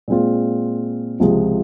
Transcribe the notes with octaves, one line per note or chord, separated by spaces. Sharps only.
A#2 G#3 C4 F4
C#2 C3 F3 G#3